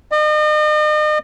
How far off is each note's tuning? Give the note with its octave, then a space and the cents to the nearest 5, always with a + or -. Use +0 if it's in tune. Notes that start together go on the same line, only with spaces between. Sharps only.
D#5 -40